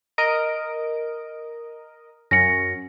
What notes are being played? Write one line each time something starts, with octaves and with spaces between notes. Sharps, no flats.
A#4 D#5 D7
F#2 C#4 A#6 C#7